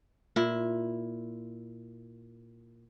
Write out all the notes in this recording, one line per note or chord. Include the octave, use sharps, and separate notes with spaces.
A#2 E4